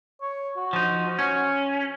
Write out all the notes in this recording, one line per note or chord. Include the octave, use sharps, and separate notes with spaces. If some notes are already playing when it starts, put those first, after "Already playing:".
C#5
F#4
F3 D#4
C#4